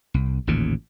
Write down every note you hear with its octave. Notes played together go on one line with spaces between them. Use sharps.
C2
A1 D#2 A#2 C#3